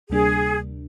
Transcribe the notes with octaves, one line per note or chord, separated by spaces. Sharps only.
D2 C3 G3 A#3 D4 G#4